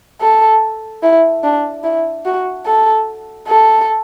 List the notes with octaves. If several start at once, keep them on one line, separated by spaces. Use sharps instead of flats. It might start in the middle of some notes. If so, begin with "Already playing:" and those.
A4
E4
D4
E4
F#4
A4
A4